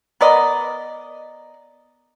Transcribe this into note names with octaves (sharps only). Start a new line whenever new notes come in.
B3 A#4 D5 D#5